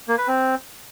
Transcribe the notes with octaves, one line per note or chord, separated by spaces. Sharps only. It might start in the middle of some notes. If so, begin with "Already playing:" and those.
A#3
B4
C4